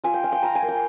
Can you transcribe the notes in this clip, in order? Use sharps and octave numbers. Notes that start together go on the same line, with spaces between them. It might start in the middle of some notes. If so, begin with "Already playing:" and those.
F4 G#5
G5
F4 F5
G5
F4 A#5
G#5
A#3
G5